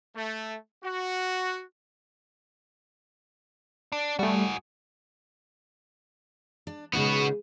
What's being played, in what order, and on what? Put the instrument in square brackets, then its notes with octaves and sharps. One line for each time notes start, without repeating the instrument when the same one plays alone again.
[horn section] A3
F#4
[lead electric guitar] D4
[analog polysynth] G3 A3 [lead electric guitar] F#4 G#4
[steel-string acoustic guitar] D4
[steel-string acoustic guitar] C#3 G#3 D#4 [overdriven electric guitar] B3 F#4